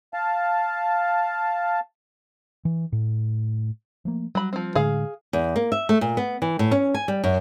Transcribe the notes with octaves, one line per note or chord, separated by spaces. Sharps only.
F5 A5
E3
A2
F3 A3 A#3
F#3 G3 B5
F3 C4
A2 D3 G#3 G#4 F5
E2
A#3
E5
A3
A#2
B3
E3
A2
C#4
G#5
G3
F#2